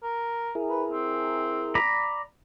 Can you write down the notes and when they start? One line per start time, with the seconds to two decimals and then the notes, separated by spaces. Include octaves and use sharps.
0.03 A#4
0.55 E4 G#4 A#4
0.69 B4
0.92 C4
1.75 D5 A#5 B5